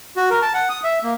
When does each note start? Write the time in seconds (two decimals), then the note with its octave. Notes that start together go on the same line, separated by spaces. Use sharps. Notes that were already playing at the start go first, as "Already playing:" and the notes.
0.17 F#4
0.30 A#4
0.42 A5
0.54 F#5
0.69 D#6
0.84 E5
1.04 A#3